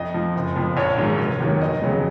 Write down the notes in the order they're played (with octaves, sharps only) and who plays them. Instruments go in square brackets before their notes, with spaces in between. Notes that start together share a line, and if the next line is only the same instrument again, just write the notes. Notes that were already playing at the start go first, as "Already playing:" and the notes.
Already playing: [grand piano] F2 D#5
F3
F#1
F2 F3
A#1 C#5
G#2 D#3 F#3
F1
D#2 D#3 F#3
F1 D#5
F2 C#3 F#3